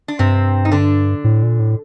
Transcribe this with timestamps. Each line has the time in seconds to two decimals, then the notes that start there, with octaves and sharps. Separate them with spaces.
0.08 D4
0.19 G2 C3 C4
0.65 D#4
0.72 D3 D4
1.24 A2
1.43 A#2
1.59 A2